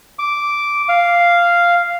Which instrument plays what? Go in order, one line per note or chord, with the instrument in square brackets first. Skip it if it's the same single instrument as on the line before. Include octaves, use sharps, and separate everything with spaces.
[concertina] D6
F5